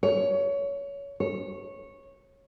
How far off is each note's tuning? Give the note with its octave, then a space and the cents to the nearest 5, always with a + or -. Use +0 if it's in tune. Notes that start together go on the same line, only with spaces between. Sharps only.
C#5 +20
C#5 -15